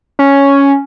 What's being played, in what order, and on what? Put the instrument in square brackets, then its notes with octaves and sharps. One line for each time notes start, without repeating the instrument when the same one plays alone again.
[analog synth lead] C#4